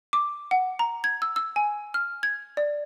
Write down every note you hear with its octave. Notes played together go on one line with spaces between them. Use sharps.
D6
F#5
A#5
G#6
E6
E6
G#5
F6
G#6
D5